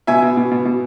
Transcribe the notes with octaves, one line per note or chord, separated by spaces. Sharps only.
B2 E5 G#5
B2
B2
B2
B2